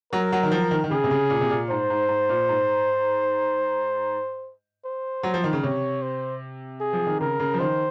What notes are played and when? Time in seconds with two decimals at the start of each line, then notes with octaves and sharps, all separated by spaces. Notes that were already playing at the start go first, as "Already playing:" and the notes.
0.13 F#3 A#4
0.32 F#3
0.43 D#3
0.51 F3
0.71 D#3
0.84 D#3
0.91 C#3 G#4
1.04 C3
1.11 C#3
1.30 A#2
1.41 C3
1.50 A#2
1.70 G#2 C5
1.90 G#2
2.08 G#2
2.29 A#2
2.49 G#2
4.85 C5
5.23 F#3
5.34 F3
5.44 D#3
5.53 C#3
5.63 C3 C#5
6.02 C5
6.81 G#4
6.93 F3
7.07 D#3
7.21 C#3 A#4
7.40 C#3
7.54 F3
7.60 D#3 C5